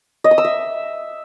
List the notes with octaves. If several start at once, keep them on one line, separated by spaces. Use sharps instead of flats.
D#5
D#6
E6
E5